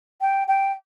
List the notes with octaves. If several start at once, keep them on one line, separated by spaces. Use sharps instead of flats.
G5
G5